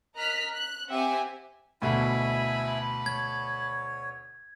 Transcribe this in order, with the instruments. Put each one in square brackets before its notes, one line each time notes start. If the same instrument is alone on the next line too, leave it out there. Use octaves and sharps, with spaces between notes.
[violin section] A#4 D#5 A#5 F6 F#6 B6
F#6
C4 G4 E5 F#5 G#5
[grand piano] D2 B2 [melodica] E4 E5 G#5 [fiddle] A5 B5
[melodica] C#5 [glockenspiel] G#6